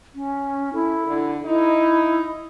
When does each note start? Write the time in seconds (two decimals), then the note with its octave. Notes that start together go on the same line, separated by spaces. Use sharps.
0.15 C#4
0.74 E4 A4
1.07 D3
1.45 D#4 E4